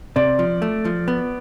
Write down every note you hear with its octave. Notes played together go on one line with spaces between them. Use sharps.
C3 D5
F3
A3
F3
B3